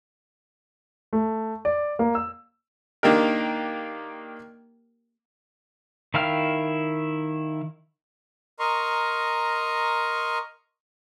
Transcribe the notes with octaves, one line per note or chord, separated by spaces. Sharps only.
A3
D5
A#3
E6
D#3 A#3 D4 G4 A#4
D#3 E4 F5 G5 F6
A#4 D#5 A#5 C6 C#6